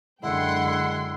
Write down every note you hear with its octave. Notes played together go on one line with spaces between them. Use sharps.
F#2 D3 G#3 E4 F#5 G5 C6